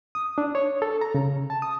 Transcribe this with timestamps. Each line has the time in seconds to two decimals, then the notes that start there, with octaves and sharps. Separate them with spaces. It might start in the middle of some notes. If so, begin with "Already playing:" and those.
0.15 D#6
0.38 D4
0.55 C#5
0.82 A4
1.01 A#5
1.15 C#3
1.50 A5
1.62 D#6